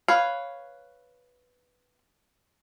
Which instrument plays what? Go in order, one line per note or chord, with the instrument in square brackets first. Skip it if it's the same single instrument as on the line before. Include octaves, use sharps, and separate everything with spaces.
[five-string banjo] B4 C#5 F5